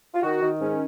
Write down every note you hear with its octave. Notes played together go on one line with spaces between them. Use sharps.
F4
D#3 F#4
D#3
G#2 C#4